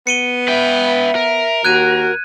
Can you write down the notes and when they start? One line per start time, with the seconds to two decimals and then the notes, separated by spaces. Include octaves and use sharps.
0.07 B3 C#7 D#7 G7
0.48 B4 E5 G5
1.15 A#4
1.65 D#2 F#4 F#6 G#6 D#7